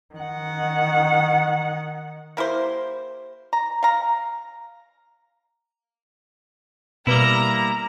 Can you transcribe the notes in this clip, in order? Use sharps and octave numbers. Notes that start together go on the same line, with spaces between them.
D#3 F#5
A#3 E4 G4 C5
A#5
F5 A#5
B2 G3 A#3 E4 B4 A#5